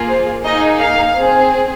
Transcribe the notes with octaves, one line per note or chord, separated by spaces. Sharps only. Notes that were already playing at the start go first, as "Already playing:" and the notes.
Already playing: A#3 F4 G#4
C5
A#3 D#4 G#4 D#5
F5
C4 G#4